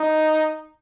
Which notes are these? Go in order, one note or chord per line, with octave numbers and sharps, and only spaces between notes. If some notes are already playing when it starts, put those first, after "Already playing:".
Already playing: D#4